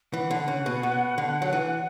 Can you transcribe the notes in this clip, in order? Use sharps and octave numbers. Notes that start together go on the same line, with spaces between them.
E3 F#5
D3
C#3
B2
B2
D3
F#3
E3